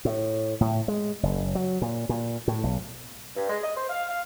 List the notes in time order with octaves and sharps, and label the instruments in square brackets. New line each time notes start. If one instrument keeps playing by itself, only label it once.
[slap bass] A2
A2
G#3
F#1
F#3
A#2
A#2
A2
B1
[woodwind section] G2
G#3
D#5
C5
F5
F5